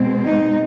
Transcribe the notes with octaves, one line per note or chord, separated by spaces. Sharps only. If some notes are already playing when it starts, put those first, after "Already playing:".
Already playing: B2 G#3 C4
D#4